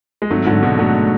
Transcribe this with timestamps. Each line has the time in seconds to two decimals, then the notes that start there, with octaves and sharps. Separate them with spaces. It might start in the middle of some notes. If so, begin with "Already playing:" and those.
0.22 G#3
0.30 G#1 F#3 A3
0.46 G#2 D3 F#3
0.62 G#2 B2 D3
0.79 D3 F#3 A3
0.94 A3